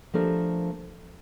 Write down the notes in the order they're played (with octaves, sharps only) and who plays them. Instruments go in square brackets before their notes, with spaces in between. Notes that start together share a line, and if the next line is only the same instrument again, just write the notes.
[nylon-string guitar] F3 A3 D4 G4 A#4